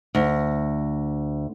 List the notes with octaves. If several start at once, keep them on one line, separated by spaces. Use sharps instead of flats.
D2